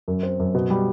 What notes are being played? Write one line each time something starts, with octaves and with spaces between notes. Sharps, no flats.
F#2
C4
F#2
B2
G3